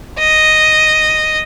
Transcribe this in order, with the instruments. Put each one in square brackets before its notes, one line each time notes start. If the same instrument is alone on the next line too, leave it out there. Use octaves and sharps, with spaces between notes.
[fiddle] D#5